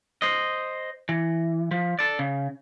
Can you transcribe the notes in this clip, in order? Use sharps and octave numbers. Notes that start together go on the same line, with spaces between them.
C5 D#5
E3
F3
A4 D5
C#3